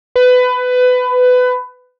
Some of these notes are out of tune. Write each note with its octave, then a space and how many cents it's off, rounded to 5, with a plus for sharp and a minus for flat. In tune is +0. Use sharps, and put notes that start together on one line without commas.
B4 +20